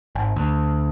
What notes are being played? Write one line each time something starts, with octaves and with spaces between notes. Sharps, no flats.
G#1
D2